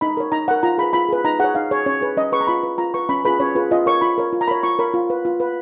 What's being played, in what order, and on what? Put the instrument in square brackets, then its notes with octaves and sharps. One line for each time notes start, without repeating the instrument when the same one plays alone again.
[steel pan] D#4 B5
A#4 C#5
D#4 A#5
A#4 C#5 F#5
F4 A#5
G#4 B4 B5
F4 B5
G#4 B4
D#4 A#5
G#4 C#5 F#5
D#4 F5
G#4 C#5
C#4 C#5
G#4 B4
C#4 D#5
G#4 B4 C#6
A#5
F4 B5
B4
F4 A#5
B4 C#6
C#4 B5
F4 G#4 B4 B5
C#4 C#5
F4 G#4 B4
F4 D#5
A#4 C#5 C#6
F4 B5
A#4 C#5
F4
A#5
A#4 C#5 B5
F4 C#6
A#4 C#5 B5
F4
B4
F4
B4